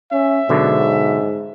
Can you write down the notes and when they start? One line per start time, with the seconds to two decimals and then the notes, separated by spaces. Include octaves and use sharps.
0.12 C#4 E5
0.49 G#2 B2 D3 F#3